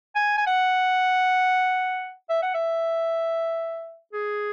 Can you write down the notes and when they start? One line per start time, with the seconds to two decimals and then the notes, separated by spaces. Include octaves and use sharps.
0.16 G#5
0.38 G#5
0.47 F#5
2.30 E5
2.43 F#5
2.54 E5
4.13 G#4